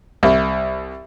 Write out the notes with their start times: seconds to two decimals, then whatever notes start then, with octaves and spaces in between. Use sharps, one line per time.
0.23 C2